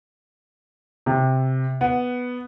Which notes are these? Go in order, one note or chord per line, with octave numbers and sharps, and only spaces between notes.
C3
B3